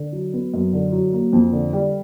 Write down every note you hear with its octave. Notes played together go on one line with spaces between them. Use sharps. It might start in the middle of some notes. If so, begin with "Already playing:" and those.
Already playing: D3
F#3
B3
F#2
D3
F#3
A#3
F2
D3
G3